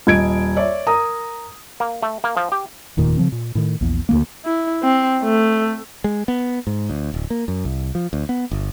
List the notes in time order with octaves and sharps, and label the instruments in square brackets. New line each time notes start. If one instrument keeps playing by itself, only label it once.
[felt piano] D#1 D#5 G#6 D7
C#5 D5 E5
A#4 A#5 D#6
[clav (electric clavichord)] A#3
A3
A#3
F3
G4
[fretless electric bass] F1 D#2 A#2 D#3
C#3 F3 C4
A#2
A2 D#3
A#1 E2
D2 G#3 A#3
[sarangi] E4
C4
A3
[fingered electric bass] G#3
B3
G#2
D2
D1
A#3
F#2
C2
F3
D2
B3
G1